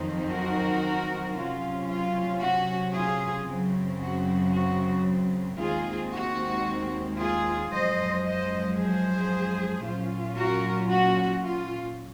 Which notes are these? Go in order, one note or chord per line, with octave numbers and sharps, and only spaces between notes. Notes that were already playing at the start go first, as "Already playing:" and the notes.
Already playing: F2 D#3 F#3 C4 D#4
F#4 A#4
C3 F#3 C#4 F4
F4
F#4
F4 G#4
F#2 C#3 F#3 C4
F#4
F#4
D#2 D#3 G#3 C4 F4 G#4
F#4
F4 G#4
F#2 F3 G#3 C5 D#5
C5 D#5
G#4 C5
A#2 F#3 C#4 F4
F#4 A#4
F#4
F4